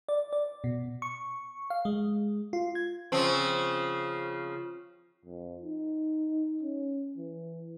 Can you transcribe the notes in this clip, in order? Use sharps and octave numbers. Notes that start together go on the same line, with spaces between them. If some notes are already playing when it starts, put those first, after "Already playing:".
D5
D5
B2
C#6
F5
G#3
F4
G#6
C#3 F3 C4
F2
D#4
C#4
E3